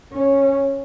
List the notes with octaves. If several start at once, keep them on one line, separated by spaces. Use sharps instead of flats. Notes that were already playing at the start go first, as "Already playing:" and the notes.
C#4